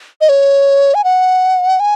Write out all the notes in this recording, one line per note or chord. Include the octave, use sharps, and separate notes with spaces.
D#5
C#5
G#5
F#5
G#5